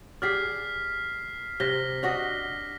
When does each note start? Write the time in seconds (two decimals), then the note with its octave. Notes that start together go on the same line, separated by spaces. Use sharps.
0.22 G4 G#4 D5 F6 B6 C7
1.60 C3 A#6 B6 G7
2.03 D4 F#4 D#5